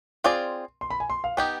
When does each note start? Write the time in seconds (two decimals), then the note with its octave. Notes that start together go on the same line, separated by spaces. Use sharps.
0.24 C4 F4 G#4 D5 C6
0.81 C6
0.90 B5
1.00 G#5
1.10 C6
1.24 F5
1.37 B3 D#4 G4 G5